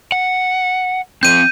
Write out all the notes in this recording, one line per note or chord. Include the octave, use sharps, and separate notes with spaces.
F#5
F3 C4 G6 D#7